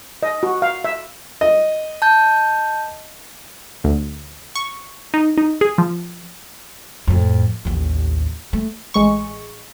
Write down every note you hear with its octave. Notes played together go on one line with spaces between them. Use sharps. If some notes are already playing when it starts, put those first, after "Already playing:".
D#5
F#4
F5
E5
D#5
A5 G6
D2
C#6
D#4
D#4
G#4
F3
F2 A2
A1 D#2
A3
A1 G#3 C#6